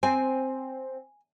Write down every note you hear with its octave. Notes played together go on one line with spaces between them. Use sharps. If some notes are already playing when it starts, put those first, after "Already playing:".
C4 G#5